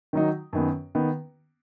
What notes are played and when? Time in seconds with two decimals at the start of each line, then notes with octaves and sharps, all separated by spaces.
0.13 D#3 F#3 D#4
0.53 F#2 D#3 B3
0.95 D#3 B3